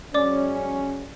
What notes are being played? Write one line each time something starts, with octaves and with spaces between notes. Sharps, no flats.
F#3 G#3 C#4 D5 D6